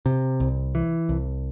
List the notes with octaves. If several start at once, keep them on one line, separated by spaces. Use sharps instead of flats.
C3
C2
E3
C2